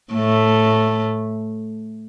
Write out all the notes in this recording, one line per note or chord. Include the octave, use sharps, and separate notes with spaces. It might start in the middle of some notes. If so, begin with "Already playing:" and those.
A2 A3